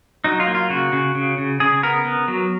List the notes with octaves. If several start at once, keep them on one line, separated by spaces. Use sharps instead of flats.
F#3 D#4
F4
A#3
F4
C#3 F#4
C#3
C#3
C#3
C#3 G#4
B3 A#4
B3
F#3